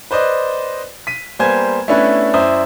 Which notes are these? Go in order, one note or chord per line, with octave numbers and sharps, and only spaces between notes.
B4 C5 D5 D#5
B6 D#7
G3 A#3 B3 C5 G#5 G#6
A3 B3 C#4 D4 E4 B4
F#2 E4 C5 D5 D#6